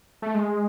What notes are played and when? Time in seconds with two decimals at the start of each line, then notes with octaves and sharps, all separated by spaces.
0.22 A3
0.34 G#3